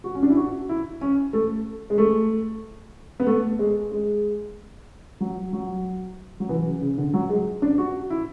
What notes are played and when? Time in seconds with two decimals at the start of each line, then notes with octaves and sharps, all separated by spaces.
0.04 F#4
0.15 C#4
0.23 D4
0.30 E4
0.37 F#4
0.69 E4
1.01 C#4
1.33 A3
1.90 G#3
1.98 A3
3.20 B3
3.27 A3
3.59 G#3
3.92 G#3
5.20 F#3
5.53 F#3
6.40 F#3
6.49 E3
6.65 C#3
6.81 C#3
6.98 D3
7.14 F#3
7.30 G#3
7.62 D4
7.78 F#4
8.10 E4